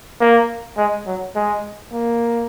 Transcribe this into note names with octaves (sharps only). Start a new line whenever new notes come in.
A#3
G#3
F#3
G#3
A#3